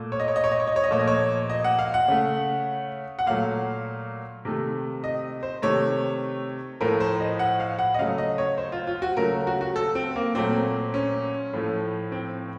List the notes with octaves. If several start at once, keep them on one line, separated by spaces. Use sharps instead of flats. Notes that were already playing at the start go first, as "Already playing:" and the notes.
Already playing: A#2 A3
C#5
D#5
C#5
D#5
C#5
D#5
C#5
D#5
C#5
D#5
A#2 F3 A3 C#5
D#5
C#5
D#5
F#5
F5
F#5
C#3 A3
F#5
A#2 F#3 A3 F5
C3 D#3 A3
D#5
C5
C3 D#3 A3 C#5
A2 F3 A3 A#4
C5
D#5
F#5
F5
F#5
D#5
C#3 F#3 A3 F5
D#5
C#5
C5
F4
F4
F#4
C#3 F#3 A3 A#4
F#4
F#4
A4
C4
A#3
A#2 F#3 A3 C4
C#4
A2 F3 A3
C4